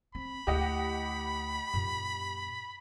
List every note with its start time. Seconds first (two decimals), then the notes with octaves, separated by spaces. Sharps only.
0.15 C4 B5
0.47 D2 E4 G4 D#5 F#5
1.74 F#2 A#2